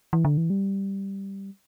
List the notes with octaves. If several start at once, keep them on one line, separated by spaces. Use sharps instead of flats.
E3
D3
E3
G3